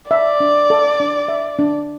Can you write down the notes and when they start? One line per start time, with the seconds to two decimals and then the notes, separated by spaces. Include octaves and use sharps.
0.11 D5 E5
0.40 D4
0.70 A4
1.00 D4
1.28 E5
1.59 D4